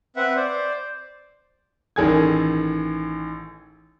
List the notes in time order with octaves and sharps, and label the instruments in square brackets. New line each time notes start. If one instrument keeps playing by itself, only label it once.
[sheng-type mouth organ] C4 B4 E5 F#5
C5 D5
[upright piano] A1 D#3 G#4 A4 G#6